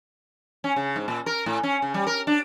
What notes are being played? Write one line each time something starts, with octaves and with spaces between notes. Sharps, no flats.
C#4
C#3
G#2
A#2
A#4
A2
C#4
C#3
G3
A#4
D4